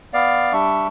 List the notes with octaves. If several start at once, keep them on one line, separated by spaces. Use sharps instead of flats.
B3 D5 F5
G3 D4 E5 C#6